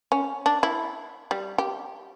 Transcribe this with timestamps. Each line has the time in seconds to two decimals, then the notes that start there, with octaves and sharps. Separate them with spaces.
0.12 C#4
0.46 D4
0.63 E4
1.31 G3
1.58 G4